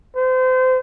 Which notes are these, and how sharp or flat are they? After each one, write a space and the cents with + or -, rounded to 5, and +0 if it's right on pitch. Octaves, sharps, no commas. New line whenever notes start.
C5 -30